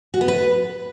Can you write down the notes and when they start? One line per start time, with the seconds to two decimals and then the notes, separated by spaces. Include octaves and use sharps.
0.14 F#4
0.21 B3
0.28 B4